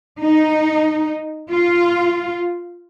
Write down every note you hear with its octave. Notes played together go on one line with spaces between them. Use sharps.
D#4
F4